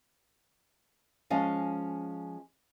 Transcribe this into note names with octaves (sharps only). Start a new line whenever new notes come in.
F3 G#3 C#4 D#5 F5